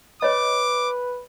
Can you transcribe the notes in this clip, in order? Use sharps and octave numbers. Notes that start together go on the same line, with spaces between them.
B4 C#5 D#5 D6